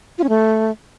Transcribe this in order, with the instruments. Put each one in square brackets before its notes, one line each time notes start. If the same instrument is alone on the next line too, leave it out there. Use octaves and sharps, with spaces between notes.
[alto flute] F4
C#4
A3